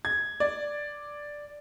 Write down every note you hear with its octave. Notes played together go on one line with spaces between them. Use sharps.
G#6
D5